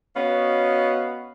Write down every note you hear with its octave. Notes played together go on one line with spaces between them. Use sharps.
B3 C#4 F#4 D#5 F5